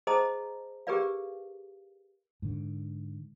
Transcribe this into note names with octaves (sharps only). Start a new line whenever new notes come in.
G#4 C5 D#5 A5 A#5 D#6
G4 G#4 A#4 B4 D5 F5
G#2 D3